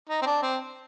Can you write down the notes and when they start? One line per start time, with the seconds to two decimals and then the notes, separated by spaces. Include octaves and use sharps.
0.09 D#4
0.22 C4
0.26 D4
0.42 C4